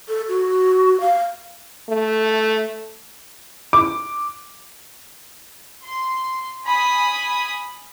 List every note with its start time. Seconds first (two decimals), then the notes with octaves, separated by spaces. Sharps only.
0.09 A4
0.29 F#4
1.01 F5
1.89 A3
3.73 D6
5.83 C6
6.66 G#5 B5 D#6